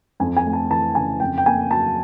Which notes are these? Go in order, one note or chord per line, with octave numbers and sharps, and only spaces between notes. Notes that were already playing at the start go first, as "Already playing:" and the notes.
F2 G#5
G#5
A3
A5
E3 A5
C#3 G#5
F2 G5
G5
A#3 G#5
F#3 A5